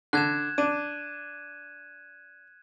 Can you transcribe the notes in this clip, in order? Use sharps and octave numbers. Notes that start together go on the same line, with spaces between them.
D3 F#6 G#6 E7
D4 D#7